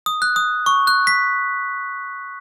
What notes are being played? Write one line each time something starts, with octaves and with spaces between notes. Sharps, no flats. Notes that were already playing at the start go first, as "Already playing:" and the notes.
D#6
F#6
D#6
C#6
F#6
B6